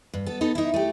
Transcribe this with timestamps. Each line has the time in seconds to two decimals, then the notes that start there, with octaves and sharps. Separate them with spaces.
0.14 G2
0.26 B3 A4
0.41 B3 D#4 A4 B4
0.55 D#4 E4
0.74 A3 G4